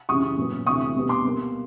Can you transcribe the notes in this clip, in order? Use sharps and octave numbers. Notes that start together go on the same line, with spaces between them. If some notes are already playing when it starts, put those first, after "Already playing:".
F#2 C#3 E3 G3 C#6 D#6
A#2 F#3 B3
D2 C3 E3 A3 C#6 D#6
B2 G3 B3
C6 D6
B2 G3 A#3